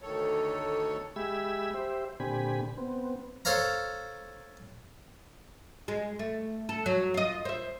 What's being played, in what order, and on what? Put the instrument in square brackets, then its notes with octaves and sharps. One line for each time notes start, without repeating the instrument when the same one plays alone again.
[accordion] D2 D#3 A4 C#5
[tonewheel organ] G#3 G4 E5 B5 E6 G#6
G4 C5 E5
A#2 D3 C4 G4 G#5 B5
B3 C4
[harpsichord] A4 C5 C#5 F5 A#5
[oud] G#3
A3
A4
F#3
F4 D#5
C5 E5